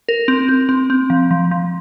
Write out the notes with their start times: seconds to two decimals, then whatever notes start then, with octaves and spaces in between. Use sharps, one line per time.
0.08 A#4
0.28 C4
0.49 C4
0.69 C4
0.90 C4
1.10 F3
1.31 F3
1.51 F3